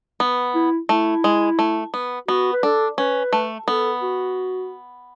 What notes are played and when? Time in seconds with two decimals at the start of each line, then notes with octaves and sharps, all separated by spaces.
0.20 B3
0.55 E4
0.89 A3 E4
1.24 G#3
1.59 A3
1.94 B3
2.28 B3 F#4
2.53 B4
2.63 D4 A4
2.98 C#4 B4
3.33 A3
3.67 B3 A4
4.02 F#4